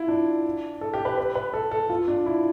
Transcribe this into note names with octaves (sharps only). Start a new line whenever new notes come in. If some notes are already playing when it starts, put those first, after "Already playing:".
Already playing: E4 F4
D4
A4
G4
B4
B4
B4
A4
A4
F4
D4
E4